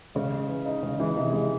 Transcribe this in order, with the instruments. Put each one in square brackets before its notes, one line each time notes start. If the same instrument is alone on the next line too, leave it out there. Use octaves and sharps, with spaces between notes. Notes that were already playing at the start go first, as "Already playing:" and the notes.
[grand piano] C#3 [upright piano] G#3
[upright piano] G#3
E3
D#4
[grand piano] C#3 [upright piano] G#3
[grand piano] C#3 E3 [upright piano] G#3
[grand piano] C3 D#3 [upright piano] D#4
[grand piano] C#3 [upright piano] G#3